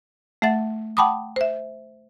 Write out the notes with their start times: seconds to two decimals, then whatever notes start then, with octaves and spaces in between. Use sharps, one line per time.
0.42 A3 E5 F#5 A6
0.97 F#5 G5 A5 B5 D6 D#6
1.36 C5 E5